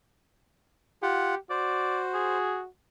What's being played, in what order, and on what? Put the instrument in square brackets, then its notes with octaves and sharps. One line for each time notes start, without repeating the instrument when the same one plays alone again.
[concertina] F4 F#5 [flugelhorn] G4
[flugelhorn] F#4 [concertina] C5 [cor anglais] D5
[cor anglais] G#4